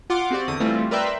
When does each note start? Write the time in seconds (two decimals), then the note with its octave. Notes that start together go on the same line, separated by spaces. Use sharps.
0.10 F4 F#5 C6 D6
0.31 C4 F#4 G4 D5
0.48 E2 D3 D#6
0.60 E3 G3 A3 C4 F4
0.91 A#4 B4 D5 E5 G5 C6